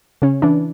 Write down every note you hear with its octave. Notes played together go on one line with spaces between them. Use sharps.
C#3 C#4
E3 D4